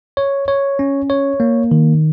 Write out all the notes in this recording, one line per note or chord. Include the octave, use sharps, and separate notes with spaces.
C#5
C#5
C#4
C#5
A#3
D#3